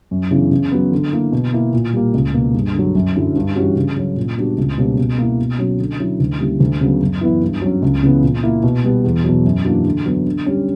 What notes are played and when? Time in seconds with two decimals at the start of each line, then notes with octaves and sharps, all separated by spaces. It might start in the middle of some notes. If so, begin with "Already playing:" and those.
0.11 F#2
0.31 C#3 E3 B3 D4
0.51 C#3
0.71 F#3 B3
0.92 D3
1.12 A#3 E4
1.32 B2
1.53 A#3 E4
1.73 A#2
1.93 G3 A#3
2.14 C#2
2.34 B2 A#3
2.54 G2
2.75 D3 F#3
2.95 F#2
3.15 D3 F#3 C#4 E4
3.36 G2
3.56 E3 G3 C#4 F#4
3.76 C#3
3.97 F#3 C#4
4.17 A#2
4.37 G3 B3 D4 F#4
4.58 C#2
4.78 B2 G3 A#3 C#4
4.98 B2
5.18 A#3 E4
5.39 B2
5.58 F#3 C#4 F#4
5.79 D3
6.00 F#3 C#4 E4
6.20 D2
6.40 C#3 G3 A#3 E4
6.60 D2
6.81 C#3 F#3 B3
7.02 F#2
7.21 E3 B3 E4
7.42 G2
7.62 F#3 C#4
7.82 C#2
8.03 C#3 E3 B3
8.23 A#2
8.43 A#3 E4
8.63 B2
8.84 G3 B3
9.04 E2
9.24 B2 F#3
9.45 F#2
9.64 E3 A#3 D4 F#4
9.85 D3
10.05 F#3 B3
10.26 D3
10.46 G3 C#4